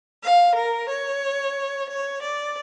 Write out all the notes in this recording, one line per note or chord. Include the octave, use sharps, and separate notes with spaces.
F5
A#4
C#5
C#5
D5